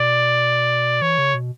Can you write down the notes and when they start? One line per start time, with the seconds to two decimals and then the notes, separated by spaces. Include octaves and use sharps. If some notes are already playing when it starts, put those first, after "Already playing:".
Already playing: B2 D5
1.02 E3 C#5
1.18 C#3
1.34 B2